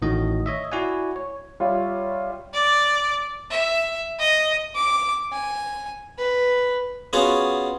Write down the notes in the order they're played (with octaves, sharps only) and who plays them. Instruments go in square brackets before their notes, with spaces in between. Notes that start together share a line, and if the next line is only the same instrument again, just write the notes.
[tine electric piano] A1 A2 D#3 F#4 D#5
C#5 D#5 E5
E4 F#4 D5 F#5 G#5
C#5
[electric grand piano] G3 F4 C#5 E5 F5
[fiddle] D5
E5
D#5
D6
G#5
B4
[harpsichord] B3 C#4 F4 F#4 G#4 F5